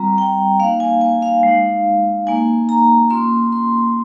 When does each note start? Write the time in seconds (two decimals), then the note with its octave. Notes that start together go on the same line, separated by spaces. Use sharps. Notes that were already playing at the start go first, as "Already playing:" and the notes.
Already playing: G3 C4 F4 A#5
0.18 G5
0.60 A#3 D#4 F5
0.80 G#5
1.01 G#5
1.22 F5
1.43 G#3 D#4
2.27 A#3 D#4 G#5
2.69 A#5
3.10 A#3 C#4 F4 C6
3.52 C6